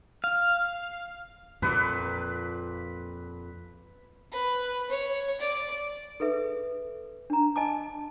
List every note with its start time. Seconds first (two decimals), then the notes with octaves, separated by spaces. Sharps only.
0.24 F5
1.62 F2 A#2 B4
4.32 B4
4.90 C#5
5.40 D5
6.20 G#4 A4 B4 E5
7.30 D4 A#5
7.56 D#5 G#5 A5 D6